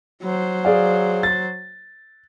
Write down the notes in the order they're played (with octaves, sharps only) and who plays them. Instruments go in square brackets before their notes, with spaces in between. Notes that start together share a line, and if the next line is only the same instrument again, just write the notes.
[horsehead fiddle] F#3 C5
[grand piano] G#4 D5 F5
A6